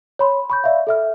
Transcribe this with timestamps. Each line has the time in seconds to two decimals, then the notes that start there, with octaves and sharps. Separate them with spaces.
0.19 C#5 B5 C6
0.50 B5 C#6 G6
0.64 D5 E5 F5
0.87 A4 E5 F6